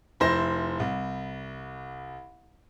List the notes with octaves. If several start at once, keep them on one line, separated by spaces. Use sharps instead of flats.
F1 E4 C5 A#6
C2